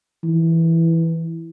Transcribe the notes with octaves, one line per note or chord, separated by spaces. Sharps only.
E3